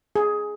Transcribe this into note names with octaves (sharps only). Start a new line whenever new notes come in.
G#4